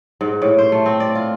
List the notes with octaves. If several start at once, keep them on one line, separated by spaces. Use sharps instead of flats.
G#2
A2
C5
A3
C4
D5
F4